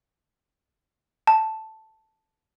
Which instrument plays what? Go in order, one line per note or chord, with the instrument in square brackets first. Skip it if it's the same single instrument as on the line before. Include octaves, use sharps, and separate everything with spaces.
[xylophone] A5